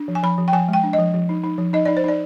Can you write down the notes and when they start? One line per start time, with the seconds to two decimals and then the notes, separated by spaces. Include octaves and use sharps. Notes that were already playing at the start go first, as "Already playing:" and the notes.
Already playing: D4
0.08 F3
0.15 G#5
0.23 F3 B5
0.38 F3
0.48 G5
0.53 F3 G#5
0.68 G#3
0.73 G5
0.83 D4
0.93 D#5
0.99 F3
1.14 F3
1.29 D#4
1.44 D#4
1.58 F3
1.73 D#4 D#5
1.85 D#4 D5
1.97 C5
2.04 D#4 D5